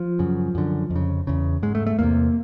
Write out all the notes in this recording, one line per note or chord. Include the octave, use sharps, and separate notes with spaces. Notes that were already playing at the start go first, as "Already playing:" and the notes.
Already playing: F3
F#2 C#3
F#2 D3
F2
C#3
E2 C#3
G#2 G#3
A3
A3
E2 C3 A#3